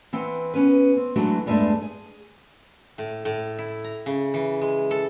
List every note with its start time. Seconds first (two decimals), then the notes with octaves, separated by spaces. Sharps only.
0.13 E3 C4 F#5
0.54 B3 C#4 A#4 B4
0.97 C4
1.16 E3 F#3 G#3 A3 D4 F#4
1.46 E2 G2 G#3 A3 D4 E5
1.82 G#4
2.98 A2
3.25 A2
3.58 E4
3.84 A#5
4.06 C#3
4.34 E3
4.61 G#3
4.91 A4